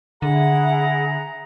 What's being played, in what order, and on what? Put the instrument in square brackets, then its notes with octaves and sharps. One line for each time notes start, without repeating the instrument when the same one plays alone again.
[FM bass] D3 [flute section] E4 G#4 E5 [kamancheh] F#5 [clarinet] A#5